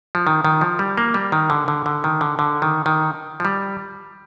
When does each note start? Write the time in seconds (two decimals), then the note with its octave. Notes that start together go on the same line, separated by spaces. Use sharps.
0.15 F3
0.27 D#3
0.45 D#3
0.61 F3
0.79 G3
0.98 A#3
1.14 G3
1.32 D#3
1.50 D3
1.68 D3
1.86 D3
2.04 D#3
2.21 D3
2.39 D3
2.62 D#3
2.86 D#3
3.40 F3
3.45 G3